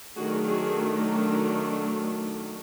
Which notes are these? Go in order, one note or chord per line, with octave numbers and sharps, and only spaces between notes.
D#3 F#3 A3 D4 F#4 G#4
F#4 G#4